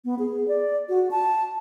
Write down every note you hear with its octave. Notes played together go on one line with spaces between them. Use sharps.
B3
G#4
D5
F#4
A5